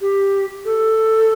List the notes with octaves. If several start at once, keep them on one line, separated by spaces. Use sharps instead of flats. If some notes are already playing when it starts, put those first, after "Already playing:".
G4
A4